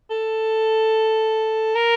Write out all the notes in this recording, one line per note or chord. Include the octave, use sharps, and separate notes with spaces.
A4
A#4